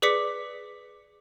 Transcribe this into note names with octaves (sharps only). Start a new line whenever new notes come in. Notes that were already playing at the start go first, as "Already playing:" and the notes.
G#4 B4 D5 D6 B6 C#7